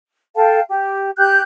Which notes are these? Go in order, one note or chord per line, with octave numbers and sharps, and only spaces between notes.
A4 F5 G5 A5
G4
G4 F#6 G6